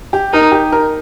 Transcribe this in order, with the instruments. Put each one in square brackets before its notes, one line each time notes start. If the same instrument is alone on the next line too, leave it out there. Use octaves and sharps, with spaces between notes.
[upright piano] G4
[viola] D#4 [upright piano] A#4
[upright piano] G4
A#4